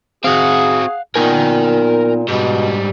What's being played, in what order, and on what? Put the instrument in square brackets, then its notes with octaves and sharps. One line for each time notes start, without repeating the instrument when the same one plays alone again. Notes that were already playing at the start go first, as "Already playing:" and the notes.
[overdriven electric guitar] C4 F#4 [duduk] G#4 [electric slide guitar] F5 F#5
[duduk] A#2 [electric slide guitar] B3 D#4 G#5 [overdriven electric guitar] A#4 G5
[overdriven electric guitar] G#2 G3 [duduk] B2